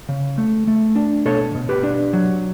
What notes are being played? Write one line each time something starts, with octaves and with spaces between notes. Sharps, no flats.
C#3
A3
A3
D4
B2 A4 C#5
B2
G4 B4
D4
F#3